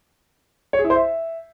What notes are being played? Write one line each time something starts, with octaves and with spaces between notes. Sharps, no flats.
C#5
G#4
E4
C5
E5